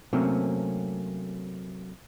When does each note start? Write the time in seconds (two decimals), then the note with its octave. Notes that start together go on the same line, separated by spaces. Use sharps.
0.13 C3 F#3 A3 A#3 C4 C#4